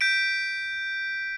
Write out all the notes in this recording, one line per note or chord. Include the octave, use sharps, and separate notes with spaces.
G6 B6 D7